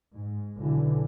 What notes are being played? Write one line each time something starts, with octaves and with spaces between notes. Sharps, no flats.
G#2
B1 D3 E3